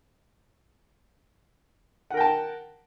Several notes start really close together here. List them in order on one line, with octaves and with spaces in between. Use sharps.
F#5 A#4 G5 A5